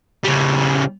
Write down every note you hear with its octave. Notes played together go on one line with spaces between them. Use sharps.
C#3 G3